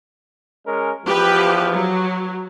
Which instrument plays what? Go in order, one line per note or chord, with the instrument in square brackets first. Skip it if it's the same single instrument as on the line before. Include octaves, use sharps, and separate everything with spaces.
[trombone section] G#3 C#4 A#4
[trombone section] E2 F3 [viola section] G4 B4
[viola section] F#3